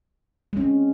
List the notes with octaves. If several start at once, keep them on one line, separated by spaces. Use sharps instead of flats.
G#3 C4 C#4